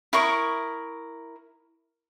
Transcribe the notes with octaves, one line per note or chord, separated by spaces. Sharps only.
E4 A#4 C#6 D#6